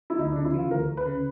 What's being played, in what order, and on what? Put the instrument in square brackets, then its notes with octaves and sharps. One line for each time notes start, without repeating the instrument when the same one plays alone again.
[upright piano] E4
[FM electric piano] D2 [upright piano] D#4
[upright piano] D4
[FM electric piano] C#3
[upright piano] E4
[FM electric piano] E3 [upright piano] F4
[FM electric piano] D2 [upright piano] A#4
[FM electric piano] D2
[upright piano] B4
[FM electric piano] C#3